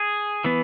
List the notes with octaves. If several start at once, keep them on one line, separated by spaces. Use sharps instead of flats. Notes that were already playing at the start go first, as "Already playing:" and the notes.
Already playing: G#4 G#5
E3 B3